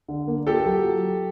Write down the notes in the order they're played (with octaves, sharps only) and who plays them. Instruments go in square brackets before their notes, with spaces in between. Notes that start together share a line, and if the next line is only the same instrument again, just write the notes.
[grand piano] D3
A#3
[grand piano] F4 [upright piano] G4 A4
[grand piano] F#3